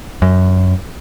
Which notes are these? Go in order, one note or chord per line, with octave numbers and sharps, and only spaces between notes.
F#2